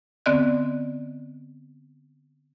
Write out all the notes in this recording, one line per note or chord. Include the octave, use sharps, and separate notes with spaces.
D3 B3 C4 D5 D#5 F#6